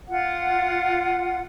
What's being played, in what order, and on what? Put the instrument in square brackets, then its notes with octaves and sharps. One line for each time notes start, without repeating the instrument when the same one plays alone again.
[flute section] F4 F#5